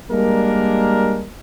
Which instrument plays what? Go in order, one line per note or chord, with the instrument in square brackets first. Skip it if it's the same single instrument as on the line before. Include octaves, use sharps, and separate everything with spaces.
[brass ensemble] G3 G#3 A#3 D4 A#4